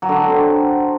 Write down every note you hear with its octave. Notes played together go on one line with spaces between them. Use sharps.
F#3
D3
D4
F#4
C4